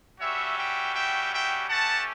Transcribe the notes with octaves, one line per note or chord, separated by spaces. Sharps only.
G3 C#4 F#4 C#5 E5
E5 G5
E5 G5
E5 G5
A3 C#4 G4 F#5 A5